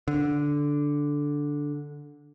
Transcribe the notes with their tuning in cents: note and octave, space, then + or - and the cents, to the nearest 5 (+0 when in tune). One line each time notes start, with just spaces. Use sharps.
D3 -5